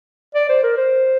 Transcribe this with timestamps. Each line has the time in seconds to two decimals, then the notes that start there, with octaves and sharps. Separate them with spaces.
0.35 D5
0.49 C5
0.63 A#4
0.77 C5